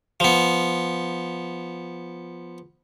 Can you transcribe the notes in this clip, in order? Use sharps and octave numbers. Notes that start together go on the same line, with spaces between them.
F3 B3